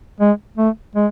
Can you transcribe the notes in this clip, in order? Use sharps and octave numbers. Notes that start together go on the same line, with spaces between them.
G#3
A3
G#3